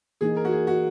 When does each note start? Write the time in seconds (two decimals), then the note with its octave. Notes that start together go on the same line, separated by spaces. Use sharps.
0.21 E3 A#3 D#4 G#4
0.37 A#4
0.45 F#4
0.52 G#4
0.67 F#4